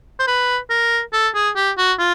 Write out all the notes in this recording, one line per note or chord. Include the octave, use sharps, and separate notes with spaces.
C5
B4
A#4
A4
G#4
G4
F#4
F4